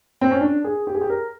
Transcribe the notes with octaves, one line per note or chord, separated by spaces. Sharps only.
C4
C#4
D4
G#4
G4
G#4
G4
A#4